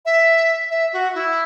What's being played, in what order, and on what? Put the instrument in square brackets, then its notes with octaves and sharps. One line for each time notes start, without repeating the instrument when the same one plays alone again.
[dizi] E5
E5
F#4
E4